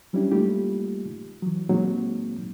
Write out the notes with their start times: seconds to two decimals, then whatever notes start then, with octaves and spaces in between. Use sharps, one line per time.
0.13 F#3 G3 C#4 D4 E4 G4
0.32 G3 A3 A#3 D#4 F4 G4
1.42 E3 F#3
1.69 A#2 F#3 G#3 A#3 C4 D#4